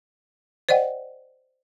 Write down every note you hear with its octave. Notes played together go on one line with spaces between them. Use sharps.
C5 D5 D#5 F#5 G5